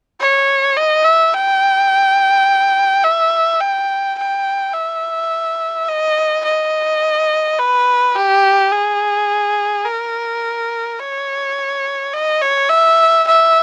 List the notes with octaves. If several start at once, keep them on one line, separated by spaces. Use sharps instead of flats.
C#5
D#5
E5
G5
E5
G5
G5
E5
D#5
D#5
B4
G4
G#4
A#4
C#5
D#5
C#5
E5
E5